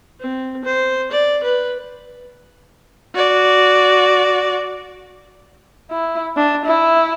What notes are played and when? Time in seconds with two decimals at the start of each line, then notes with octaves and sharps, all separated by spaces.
0.20 C4
0.64 C5
1.11 D5
1.43 B4
3.14 F#4 D5
5.91 E4
6.37 D4
6.66 E4